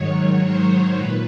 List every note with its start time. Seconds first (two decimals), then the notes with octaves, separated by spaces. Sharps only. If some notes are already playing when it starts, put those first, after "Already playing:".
Already playing: G#2 D#3 F#3 C#5
0.43 C5
0.96 A#2 B4